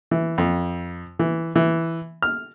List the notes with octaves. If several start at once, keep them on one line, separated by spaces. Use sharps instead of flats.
E3
F2
E3
E3
F6